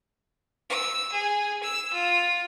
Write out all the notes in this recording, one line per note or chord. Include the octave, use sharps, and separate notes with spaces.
E6
G#4
E6
F4